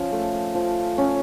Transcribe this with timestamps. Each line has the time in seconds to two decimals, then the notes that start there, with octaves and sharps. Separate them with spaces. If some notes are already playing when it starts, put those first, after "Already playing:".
Already playing: F3 C#4
0.12 A3
0.55 F3
0.98 C#4